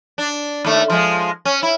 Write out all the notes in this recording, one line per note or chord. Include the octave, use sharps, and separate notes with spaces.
D4
D#2 A3
F3 G#3
C#4
E4